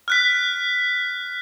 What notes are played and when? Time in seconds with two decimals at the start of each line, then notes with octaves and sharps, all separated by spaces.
0.08 F6 F#6 B6